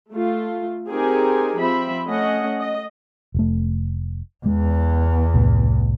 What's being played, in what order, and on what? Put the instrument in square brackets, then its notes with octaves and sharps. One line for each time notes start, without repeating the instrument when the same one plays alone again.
[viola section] A3 F4
C4 D#4 G4 G#4 A#4 G#5
F3 C4 E5 B5
A3 C#4 D#5 F#5
D#5
[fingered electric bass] F1 A3
[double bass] E2 [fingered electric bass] G#3
[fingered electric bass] C2 A2